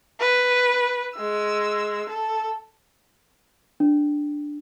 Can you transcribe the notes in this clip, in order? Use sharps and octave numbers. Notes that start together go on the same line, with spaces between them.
B4
G#3 E6
A4
D4